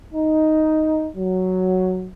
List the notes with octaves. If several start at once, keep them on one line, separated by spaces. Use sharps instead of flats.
D#4
F#3